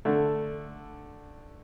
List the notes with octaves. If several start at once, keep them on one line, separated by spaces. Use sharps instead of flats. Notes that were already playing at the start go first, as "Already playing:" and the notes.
D3 A3